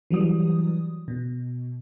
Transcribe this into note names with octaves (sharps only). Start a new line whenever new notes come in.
E3 F#3 G3 D#6
B2